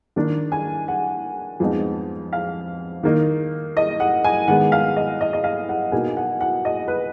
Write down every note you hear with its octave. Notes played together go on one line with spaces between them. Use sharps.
D#3 A#3 D4
G#5
F#5
F2 F3 G#3 B3 D#4
F5
D#3 A#3 D#4
D#5
F#5
G#5
D#3 G#3 B3 F#5
F5
D#5
D#5
D#5
F5
F#5
B2 A#3 D#4 G#5
F#5
F#5
D#5
B4